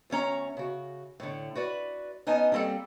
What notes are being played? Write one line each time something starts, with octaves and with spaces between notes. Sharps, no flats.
D2 A3 C#4 A#5
C#3 F#4
A2 D3
F#4 B4 D5
B3 C#4 D#4 D#5 G#5 A5
G3 A#3 C4 F4 A4